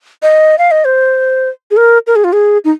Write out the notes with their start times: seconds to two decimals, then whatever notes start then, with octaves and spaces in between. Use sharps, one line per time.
0.23 D#5
0.58 F5
0.71 D#5
0.85 C5
1.71 G#4
1.77 A#4
2.07 A#4
2.16 G#4
2.24 F4
2.33 G#4
2.65 D#4